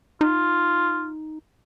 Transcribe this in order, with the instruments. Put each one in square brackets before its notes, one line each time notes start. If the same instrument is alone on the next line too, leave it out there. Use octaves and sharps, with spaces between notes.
[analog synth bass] D#4 [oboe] F4